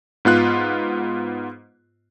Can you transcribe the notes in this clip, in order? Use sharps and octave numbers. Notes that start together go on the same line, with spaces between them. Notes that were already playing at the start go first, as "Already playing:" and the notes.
G#2 B3 F4 F#6